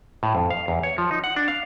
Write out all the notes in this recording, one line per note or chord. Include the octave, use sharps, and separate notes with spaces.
A2
F2
F5
E2
C#5
F3
D#4
F#5
D4
F5